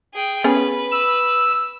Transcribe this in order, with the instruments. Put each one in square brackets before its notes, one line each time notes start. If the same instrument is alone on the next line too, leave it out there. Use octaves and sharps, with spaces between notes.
[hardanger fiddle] G#4 G5
[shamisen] B3 C#4 G#4 [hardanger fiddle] B4
[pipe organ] E6